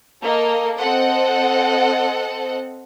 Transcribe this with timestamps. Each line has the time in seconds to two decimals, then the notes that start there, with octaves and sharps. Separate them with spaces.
0.22 A#3 A4 D#5
0.77 C4 A4 C5 D#5 F#5